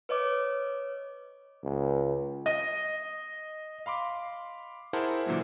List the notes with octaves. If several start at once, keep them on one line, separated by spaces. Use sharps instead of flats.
B4 C#5 D#5 D6
C#2
D#5
F5 B5 C6 D6
E4 G#4 A#4 C5 F#5 A5
A#2 D3 E3 F#3 A#3